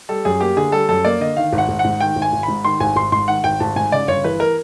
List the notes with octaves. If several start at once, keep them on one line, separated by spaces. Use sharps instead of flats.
G3 A4
F#2 G#4
A#3 G4
D3 G#4
G3 A4
F#2 A4
A#3 D5
D3 D#5
D#3 F5
G#1
F#5
G#1
F#5
G#2
D#3 G5
G#1
G#5
G#1
G#2 B5
D#3 C6
G#1 G#5
G#1 C6
G#2 C6
D#3 F#5
G#1 G5
G#1 A5
G#2 G#5
C#3 D5
G1 C#5
E3 B4
A#4